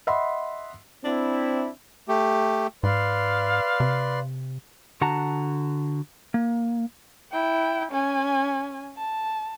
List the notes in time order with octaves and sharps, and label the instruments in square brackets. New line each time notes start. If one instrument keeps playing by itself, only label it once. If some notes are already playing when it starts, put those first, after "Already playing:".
[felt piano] D#5 E5 F#5 B5 C6
[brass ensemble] C4 E4 [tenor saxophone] D4
[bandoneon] A3 G4
[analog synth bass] G#2 [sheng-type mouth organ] B4 D5 C6 [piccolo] F5
[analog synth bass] C3
[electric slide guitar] D3 F#4 F#5 A5 A#5
A#3
[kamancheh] E4 G5
C#4 G#5
A5